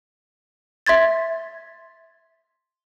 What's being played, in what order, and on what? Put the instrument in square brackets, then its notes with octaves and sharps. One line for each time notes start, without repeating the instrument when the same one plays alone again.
[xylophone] E5 C6 G#6 A6